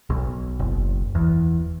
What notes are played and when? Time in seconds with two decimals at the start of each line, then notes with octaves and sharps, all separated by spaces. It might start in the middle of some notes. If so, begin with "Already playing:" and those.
0.10 B1
0.59 F#1
1.15 E2